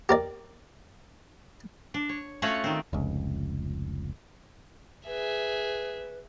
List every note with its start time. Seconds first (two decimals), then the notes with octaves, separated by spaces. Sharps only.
0.09 G4 A#4 D5
1.94 D4
2.09 C#5
2.42 A3 C#4 F4 F#4 C#5 F#5
2.64 D#3 C4
2.93 F1 C#2
5.07 G#4 B4 E5